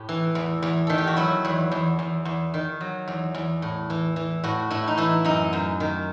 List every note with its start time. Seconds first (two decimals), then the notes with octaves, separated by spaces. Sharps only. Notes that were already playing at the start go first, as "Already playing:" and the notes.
Already playing: A2 G4
0.09 E3
0.35 E2
0.62 E2
0.87 D#3 A4
0.98 G4
1.07 F#4
1.17 F#3 E4
1.45 E2
1.71 E2
1.99 E2
2.25 E2
2.54 D#3
2.81 F#3
3.08 E2
3.34 E2
3.62 A2
3.90 E3
4.16 E3
4.44 A2 F#4
4.70 A2 E4
4.88 D#4
4.98 E3 E4
5.24 F#2 D#4
5.53 F#2
5.80 D#3